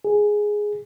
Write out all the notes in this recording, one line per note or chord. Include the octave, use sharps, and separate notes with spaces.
G#4